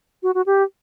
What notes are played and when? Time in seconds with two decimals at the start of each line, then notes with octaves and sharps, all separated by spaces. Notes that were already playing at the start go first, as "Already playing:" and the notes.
0.23 F#4
0.35 F#4
0.46 G4